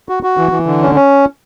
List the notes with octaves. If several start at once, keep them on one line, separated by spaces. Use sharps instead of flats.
F#4
F#4
E3
E3
D3
C#4
C#4